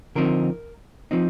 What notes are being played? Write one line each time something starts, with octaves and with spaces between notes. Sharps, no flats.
D3 F3 C4 D#4 A#4
F3 C4 D#4